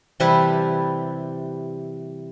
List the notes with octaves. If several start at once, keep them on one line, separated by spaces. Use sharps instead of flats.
C3 E3 G3 E4 A4 B4